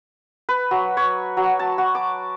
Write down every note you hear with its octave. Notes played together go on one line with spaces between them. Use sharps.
B4
F#3
C#5
F#3
A5
F#4
D6